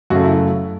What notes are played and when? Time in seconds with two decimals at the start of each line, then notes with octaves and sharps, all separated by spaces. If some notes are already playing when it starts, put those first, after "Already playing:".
0.10 F#2 C#3 A3 F#4
0.24 E4